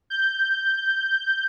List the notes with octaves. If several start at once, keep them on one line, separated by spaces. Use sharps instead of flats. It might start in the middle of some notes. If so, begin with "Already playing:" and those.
G6